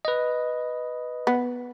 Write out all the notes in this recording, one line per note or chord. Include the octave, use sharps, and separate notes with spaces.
B4 D#5
B3